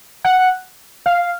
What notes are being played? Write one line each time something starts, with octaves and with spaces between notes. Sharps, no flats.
F#5
F5